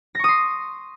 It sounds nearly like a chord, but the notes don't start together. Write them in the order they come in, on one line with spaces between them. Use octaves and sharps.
A#6 C#6 D#6 C6